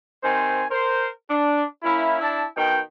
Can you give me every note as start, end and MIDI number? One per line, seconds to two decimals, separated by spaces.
0.24 0.65 48
0.24 0.65 51
0.24 0.65 60
0.24 0.65 72
0.24 0.65 80
0.70 1.07 70
0.70 1.07 72
1.30 1.64 62
1.83 2.19 58
1.83 2.19 61
1.83 2.19 64
2.21 2.43 62
2.21 2.43 64
2.21 2.43 81
2.57 2.79 47
2.57 2.79 51
2.57 2.79 79